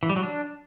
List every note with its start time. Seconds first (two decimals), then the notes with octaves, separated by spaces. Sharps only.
0.03 E3
0.09 G3
0.16 F#3
0.23 D4